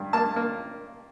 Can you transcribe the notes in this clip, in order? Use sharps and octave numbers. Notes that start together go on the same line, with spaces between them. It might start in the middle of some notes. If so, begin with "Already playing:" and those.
Already playing: G2
A#3 A5
A#3